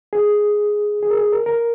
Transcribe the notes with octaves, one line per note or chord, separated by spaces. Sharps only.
G#4
G#4
A#4
G#4
A#4
A#4